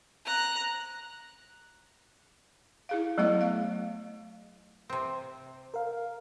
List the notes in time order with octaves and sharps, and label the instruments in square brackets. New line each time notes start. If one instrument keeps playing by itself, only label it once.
[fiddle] A#5 F#6
[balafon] E4 G#4 F5
F#3 A3 B3 E4 C#5 E5
F5
[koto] C3 C4
[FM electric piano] A#4 F5